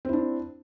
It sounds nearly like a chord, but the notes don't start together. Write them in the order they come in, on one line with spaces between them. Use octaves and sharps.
C4 E4 D4